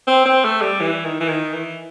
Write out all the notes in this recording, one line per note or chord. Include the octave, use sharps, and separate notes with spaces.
C4
C4
A3
G3
E3
D#3
E3
D#3
E3